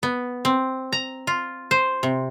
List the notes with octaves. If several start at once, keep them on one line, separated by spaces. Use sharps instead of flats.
B3
C4
A#5
F4
C5
C3